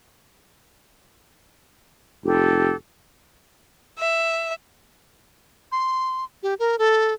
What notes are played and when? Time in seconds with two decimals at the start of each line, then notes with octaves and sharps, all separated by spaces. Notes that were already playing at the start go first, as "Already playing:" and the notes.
2.25 F1 G4 A4
3.99 E5
5.72 C6
6.43 G4
6.59 A#4
6.79 A4